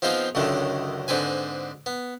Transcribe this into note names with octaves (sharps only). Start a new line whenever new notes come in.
F3 B3 C4 D#4 F4 G#4
C#2 F#2 D3 D#3 G#3 A3
G#2 D3 C4 B4 G#5
B3